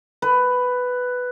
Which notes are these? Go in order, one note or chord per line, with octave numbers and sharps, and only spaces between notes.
B4